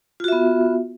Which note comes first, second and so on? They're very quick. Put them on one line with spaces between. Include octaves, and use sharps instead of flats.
F4 F#4 E5 B3